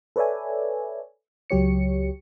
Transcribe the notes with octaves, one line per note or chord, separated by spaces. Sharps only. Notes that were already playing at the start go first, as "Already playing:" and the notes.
A4 B4 C#5 D5 E5 G#5
C#2 F#3 G4 C#5 C#7